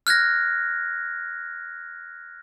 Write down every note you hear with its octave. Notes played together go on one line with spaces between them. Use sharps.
F6 F#6 G#6 A#6